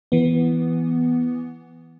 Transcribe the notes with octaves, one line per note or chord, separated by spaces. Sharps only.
E3 B3